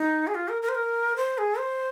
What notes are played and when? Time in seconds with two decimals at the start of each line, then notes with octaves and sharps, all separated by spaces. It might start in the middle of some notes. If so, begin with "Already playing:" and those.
Already playing: D#4
0.27 G#4
0.35 F4
0.49 A#4
0.62 A#4
0.69 C5
0.75 A#4
1.16 C5
1.38 G#4
1.58 C5